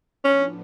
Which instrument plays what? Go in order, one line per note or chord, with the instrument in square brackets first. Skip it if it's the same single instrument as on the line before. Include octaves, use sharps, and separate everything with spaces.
[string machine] A2 F3 B3 D4 [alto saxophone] C#4